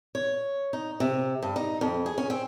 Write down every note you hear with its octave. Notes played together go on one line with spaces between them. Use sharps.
C#5
D#4
C3
G2
D#4
F2
G#4
C#4
C4